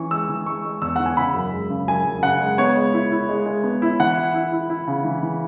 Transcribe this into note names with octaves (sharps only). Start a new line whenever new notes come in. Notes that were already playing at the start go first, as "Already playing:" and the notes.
Already playing: E3 C#4 C#6
G#3 E6
E3
G#3 C#6
G#3
E2 E6
E3 F#5
G#5
C#3 B5
F#2
G#3
C#3
F#2 G#5
F#2
C#3 F#5
G#3
B3 C#5
G#3
E4
E4
G#3
G#3
B3
E4
E3 F#5
E4
E4
E4
E4
C#3
E3
E3